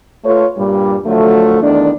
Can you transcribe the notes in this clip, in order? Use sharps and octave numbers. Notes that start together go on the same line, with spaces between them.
A3 F4 A4 B4 C#5
G2 A#2 G3
D3 F3 F#3 A3
E2 D#3 A3 D4